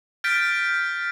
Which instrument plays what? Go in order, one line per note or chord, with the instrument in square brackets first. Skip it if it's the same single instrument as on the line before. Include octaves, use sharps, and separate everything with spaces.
[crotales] F6 G6 A6 B6 D7